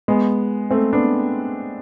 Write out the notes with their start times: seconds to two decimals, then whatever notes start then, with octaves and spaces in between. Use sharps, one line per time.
0.08 G#3 B3
0.71 A3 C4
0.93 B3 D4